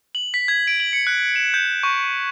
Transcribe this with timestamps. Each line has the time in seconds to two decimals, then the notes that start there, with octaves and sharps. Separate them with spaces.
0.15 F#7
0.34 B6
0.48 G#6
0.67 D7
0.80 F#7
0.93 C#7
1.07 F#6
1.36 E7
1.54 G6
1.83 C#6